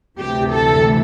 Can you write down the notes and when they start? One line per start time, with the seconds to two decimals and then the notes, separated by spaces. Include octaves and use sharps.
0.17 D2 C3 E3 G4
0.53 A4